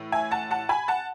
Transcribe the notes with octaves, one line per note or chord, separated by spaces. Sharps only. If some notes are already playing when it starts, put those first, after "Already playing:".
Already playing: A2 E3
E5 G#5
F#5 A5
F#5 A5
G#5 B5
F#5 A5